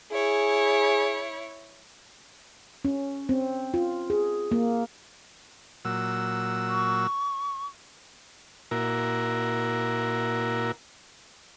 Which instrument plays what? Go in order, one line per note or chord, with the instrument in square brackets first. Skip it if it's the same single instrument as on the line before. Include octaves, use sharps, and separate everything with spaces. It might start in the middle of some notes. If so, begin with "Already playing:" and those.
[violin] E4 C#5 [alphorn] G#4
[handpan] C#4
C4
F4
G#4
A#3
[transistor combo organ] A#2 F#3 E6
[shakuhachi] C#6
[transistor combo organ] A#2 E4 F#4 A#4